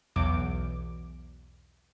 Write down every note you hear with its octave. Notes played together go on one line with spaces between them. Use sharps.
B1 E2 D6